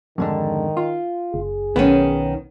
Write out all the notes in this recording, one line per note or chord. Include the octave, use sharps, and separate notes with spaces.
F2 G#2 D3 D#3
F4
F#1 G#4
B1 D#3 B3 C#4